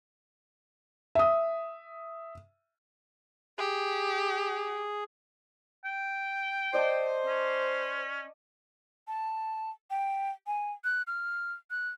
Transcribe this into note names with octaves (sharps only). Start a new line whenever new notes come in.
E5 D#6
G4 G#4
G5
C5 D5 D#5 A5
C#4
A5
G5
G#5
F#6
F6
F#6